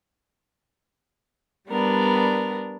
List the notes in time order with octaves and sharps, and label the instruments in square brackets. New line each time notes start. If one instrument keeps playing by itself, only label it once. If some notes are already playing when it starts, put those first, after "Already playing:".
[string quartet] G3 B3 D4 A#4